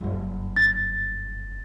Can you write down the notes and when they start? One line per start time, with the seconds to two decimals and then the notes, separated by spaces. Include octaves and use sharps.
0.01 F#1 G2
0.56 A6